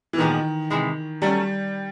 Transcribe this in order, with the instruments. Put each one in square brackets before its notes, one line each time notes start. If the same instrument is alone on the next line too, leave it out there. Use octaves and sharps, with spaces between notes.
[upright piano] E3
[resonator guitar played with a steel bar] A#2 F3 G#3 B3 [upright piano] D#3
[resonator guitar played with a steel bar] C3 E3 G#3
[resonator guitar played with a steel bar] F#3 A3 C#4 [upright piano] G3